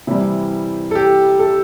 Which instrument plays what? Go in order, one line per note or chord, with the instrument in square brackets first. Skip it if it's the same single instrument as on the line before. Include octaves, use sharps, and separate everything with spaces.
[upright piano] C3 E3 G3 E4
A4
G4
A4